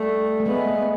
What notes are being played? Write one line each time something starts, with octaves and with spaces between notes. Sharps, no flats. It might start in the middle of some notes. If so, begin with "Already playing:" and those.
Already playing: G3 A3
A3
G#3 B3